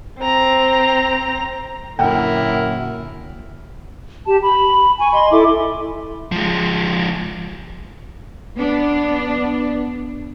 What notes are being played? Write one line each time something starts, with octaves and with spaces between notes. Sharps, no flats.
C4 A#5
F#2 A#2 D3 E4 A#4 F#5 G5
G4 A5
B5
G#5 C#6
D#5 B5 C6
E4 A4 E5 D6
F3 G#3
B3 D4